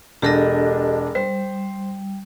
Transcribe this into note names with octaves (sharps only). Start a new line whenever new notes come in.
E1 D4 G4 A4 D#5 A#6
G3 C5